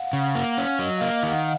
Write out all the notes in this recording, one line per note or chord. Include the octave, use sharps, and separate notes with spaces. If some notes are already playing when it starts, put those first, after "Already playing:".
Already playing: F5 F#5
C#3 F#5
A#3
F5
C#4
F#3 D#5
D#5
A#3 F5
F5
D#3
F#5